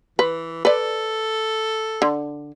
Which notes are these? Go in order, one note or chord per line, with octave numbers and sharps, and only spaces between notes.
E3 B4
A4 B4 D5
D3